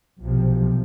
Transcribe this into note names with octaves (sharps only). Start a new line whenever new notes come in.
B1 C3 F3